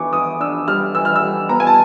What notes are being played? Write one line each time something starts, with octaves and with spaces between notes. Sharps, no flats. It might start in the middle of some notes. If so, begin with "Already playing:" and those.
Already playing: E3 B3 D4 C#6 D6
E3 D#6
D4 E6
G3 F6
E3 E6
F6
E6
G3
B3 A#5
G#5
A5